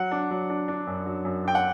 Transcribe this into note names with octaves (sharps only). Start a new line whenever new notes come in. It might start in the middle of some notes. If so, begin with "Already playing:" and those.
Already playing: F#3 F#5
D4
F#3
D4
D4
F#2
F#3
F#2
D4 G5
F#5